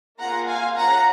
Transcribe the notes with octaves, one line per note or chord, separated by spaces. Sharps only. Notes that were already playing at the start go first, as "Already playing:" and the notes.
A#3 F4 G#4 F#5 A#5
F5 G#5
C#4 F4 G#4 F#5 A#5